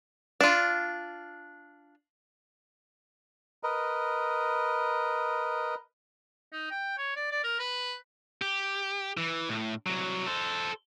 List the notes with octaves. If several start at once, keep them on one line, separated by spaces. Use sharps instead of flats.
D4 F4
A#4 B4 D#5
D#4
G5
C#5
D5
D5
A#4
B4
G4
E3
A2
C2 F#3
A4 C5